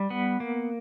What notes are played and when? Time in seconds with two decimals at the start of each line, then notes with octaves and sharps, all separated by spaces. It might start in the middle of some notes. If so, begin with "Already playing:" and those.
Already playing: G3
0.10 B3
0.40 A#3